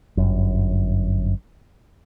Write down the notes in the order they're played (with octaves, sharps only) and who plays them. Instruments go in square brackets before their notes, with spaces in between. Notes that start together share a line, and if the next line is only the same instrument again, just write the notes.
[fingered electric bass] G1 F#2